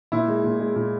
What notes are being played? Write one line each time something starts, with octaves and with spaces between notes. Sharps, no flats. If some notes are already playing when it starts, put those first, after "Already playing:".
A#2 E4
G#3
A#2
G#3
A#2